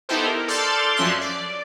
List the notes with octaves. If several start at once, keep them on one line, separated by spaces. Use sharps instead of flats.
B3 D#4 E4 G4 A4 C5
A#4
A4 D5 C6 F6 G6 A6
F#2 F3 C#4 E5 C6 F#6
D5